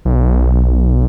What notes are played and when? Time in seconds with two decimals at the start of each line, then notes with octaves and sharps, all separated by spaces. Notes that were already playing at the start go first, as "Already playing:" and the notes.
0.05 B1